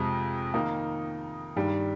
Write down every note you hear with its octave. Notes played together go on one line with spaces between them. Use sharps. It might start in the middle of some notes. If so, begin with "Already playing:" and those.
Already playing: F2 C3 F3 G#3
D#3 A#3 D#4
G2 D#3 G3